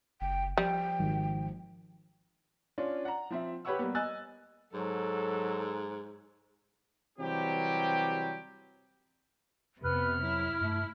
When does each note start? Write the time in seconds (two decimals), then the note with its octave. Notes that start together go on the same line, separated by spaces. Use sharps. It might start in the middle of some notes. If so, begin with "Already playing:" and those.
0.21 F#1 G5
0.58 F3 G3 G5
0.99 G#1
2.78 C#4 D4 F4
3.05 F#5 A#5
3.30 F3 C4 E5
3.65 G4 B4 C#5 F#5 C#6 E6
3.79 G3 A#3 B3
3.95 D#5 G#5 E6 F#6 A6
4.74 G#2 F#3 A4
7.19 C3 E3 F#3 G3 C4 G4
9.84 F2 C3 B3 B4 F6
10.21 F#3 E4
10.61 G2 A3